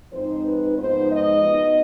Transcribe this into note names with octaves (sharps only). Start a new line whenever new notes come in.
G#2 F3 C4 D#4 C5
B4
G#2 F3 G#3 B3 D#4 C5
D#5
B2 B3 D#4